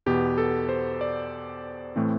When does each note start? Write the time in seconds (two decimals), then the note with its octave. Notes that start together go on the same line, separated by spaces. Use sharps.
0.06 E2 B2 B3 G4
0.38 A4
0.69 C5
1.01 D5
1.96 A2 E3 A3 C4